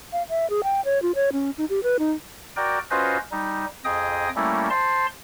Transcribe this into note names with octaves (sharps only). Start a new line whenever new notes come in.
F5
E5
G#4
G5
C#5
F4
C#5
C#4
D#4
G4
B4
D#4
F#4 A#4 D5 G5
C#4 F4 F#4 B4 C5 D#5
G3 D#4
F2 G#4 D#5 G5 D#6
G3 A3 A#3 C#4 E4
C5 A5 C6